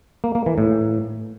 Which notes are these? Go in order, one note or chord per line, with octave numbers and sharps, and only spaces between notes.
A#3
A#3
E3
A2